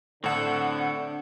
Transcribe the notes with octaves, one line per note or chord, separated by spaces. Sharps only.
A2 D3 C4 A4 F#5